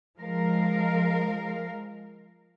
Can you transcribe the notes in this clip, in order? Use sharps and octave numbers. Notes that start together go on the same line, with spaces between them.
F3 G#3 A#4 F5